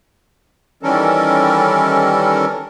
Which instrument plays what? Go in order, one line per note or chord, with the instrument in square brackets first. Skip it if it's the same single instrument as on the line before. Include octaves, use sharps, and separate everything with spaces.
[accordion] D#3 E3 G3 C#4 A4 A#4